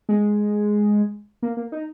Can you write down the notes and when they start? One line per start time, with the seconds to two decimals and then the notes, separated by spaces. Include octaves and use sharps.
0.09 G#3
1.42 A#3
1.57 A#3
1.72 D#4